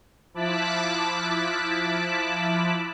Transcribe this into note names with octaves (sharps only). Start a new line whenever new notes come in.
F3 E4 A5 D6 F#6 B6